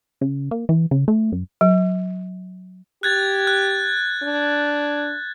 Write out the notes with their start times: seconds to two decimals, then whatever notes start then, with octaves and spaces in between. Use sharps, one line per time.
0.21 C#3
0.51 A#3
0.69 E3
0.91 C#3
1.08 A3
1.32 F#2
1.61 F#3
3.03 G4 F#6 G#6 A6
3.47 F#6
4.23 D4